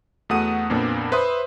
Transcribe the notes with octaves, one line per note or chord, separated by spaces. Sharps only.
E2 A3 F#4 F#5 D#6 D#7
F2 A#2 A#3 B3 D4
B4 C5 E5 C6 D#6